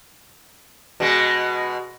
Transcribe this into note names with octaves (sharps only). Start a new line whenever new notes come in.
B2 G#3